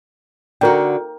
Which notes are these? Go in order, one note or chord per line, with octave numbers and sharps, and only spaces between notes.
D3 F#4 A#4 G5